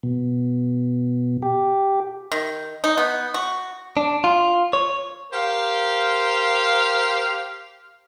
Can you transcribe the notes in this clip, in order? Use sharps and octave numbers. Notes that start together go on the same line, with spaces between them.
B2
G4
D#3
D#4
B3
F#4
D4
F4
C#5
G4 A#4 C5 F5